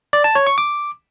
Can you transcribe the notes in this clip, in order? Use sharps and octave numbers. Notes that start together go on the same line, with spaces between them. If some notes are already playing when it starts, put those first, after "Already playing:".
D5
A5
C#5
C#6
D6